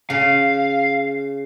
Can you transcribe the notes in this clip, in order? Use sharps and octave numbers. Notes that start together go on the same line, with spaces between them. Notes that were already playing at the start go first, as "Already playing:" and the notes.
C#3 F5